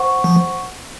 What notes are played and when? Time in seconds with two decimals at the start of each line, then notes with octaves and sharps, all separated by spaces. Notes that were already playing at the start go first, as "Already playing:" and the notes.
Already playing: C5 F#5 C#6
0.24 F3